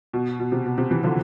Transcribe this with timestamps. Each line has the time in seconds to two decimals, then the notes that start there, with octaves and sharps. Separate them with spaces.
0.13 B2
0.40 B2
0.52 C3
0.66 B2
0.78 C3
0.91 C3 E3
1.03 D3 F3